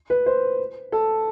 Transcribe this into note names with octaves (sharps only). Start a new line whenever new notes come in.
B4
C5
A4